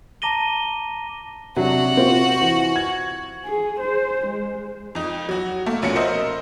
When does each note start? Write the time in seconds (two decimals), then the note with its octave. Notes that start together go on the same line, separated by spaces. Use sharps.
0.22 A5 A#5 D6 A#6 D#7 G7
1.57 C3 F#3 D4 F#4
1.97 C4 F4
2.40 E3
2.76 G#6
3.45 G#4
3.80 C5
4.26 G#3
4.95 F2 D#4
5.29 F#3 F#4
5.66 A3 A#3 A#4
5.82 F1 B1 F3 C#4 F#4 C#7
5.96 A#4 C5 D#5 E5